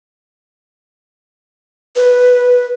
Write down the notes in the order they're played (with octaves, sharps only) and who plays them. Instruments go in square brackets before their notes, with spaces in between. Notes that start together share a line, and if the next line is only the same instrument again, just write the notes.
[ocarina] B4